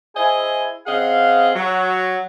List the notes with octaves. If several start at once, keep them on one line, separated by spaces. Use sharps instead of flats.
E4 G#4 C5 D#5 G#5
C#3 C4 G#4 D#5 F5 F#5
F#3